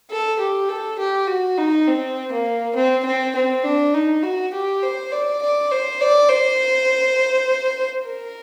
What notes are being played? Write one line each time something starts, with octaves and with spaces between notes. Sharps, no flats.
A4
G4
A4
G4
F#4
D#4
C4
A#3
C4
C4
C4
D4
D#4
F#4
G4
C5
D5
D5
C5
D5
C5
A#4